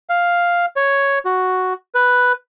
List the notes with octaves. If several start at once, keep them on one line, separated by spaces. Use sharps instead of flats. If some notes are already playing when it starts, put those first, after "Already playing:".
F5
C#5
F#4
B4